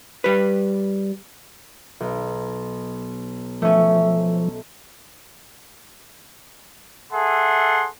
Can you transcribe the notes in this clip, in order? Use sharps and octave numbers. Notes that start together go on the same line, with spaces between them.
G3 B4
B1
F3 A3 C#4
G#4 A4 E5 F#5 C6